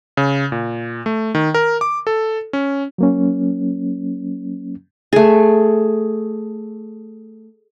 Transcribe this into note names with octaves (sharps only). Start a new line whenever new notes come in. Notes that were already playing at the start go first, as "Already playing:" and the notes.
C#3
A#2
A3
D#3
A#4
D6
A4
C#4
F#3 A#3 C#4
A3 G#4